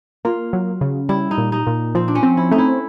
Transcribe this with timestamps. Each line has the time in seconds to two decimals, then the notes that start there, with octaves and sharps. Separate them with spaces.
0.25 A#3 F4
0.53 F#3
0.81 C#3
1.09 G3 E4
1.31 D#4
1.38 A#2
1.52 D#4
1.67 A#2
1.95 F3 C4
2.08 D4
2.15 C#4
2.23 C4
2.37 E4
2.51 A3 D#4
2.58 E4